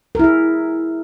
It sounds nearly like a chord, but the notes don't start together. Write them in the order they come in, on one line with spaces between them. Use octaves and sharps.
A#4 E4 G#4